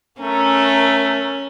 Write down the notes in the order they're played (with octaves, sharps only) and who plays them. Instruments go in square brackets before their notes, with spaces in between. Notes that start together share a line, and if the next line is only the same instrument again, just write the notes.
[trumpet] A3 [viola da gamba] C#4 [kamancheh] A#4 A#5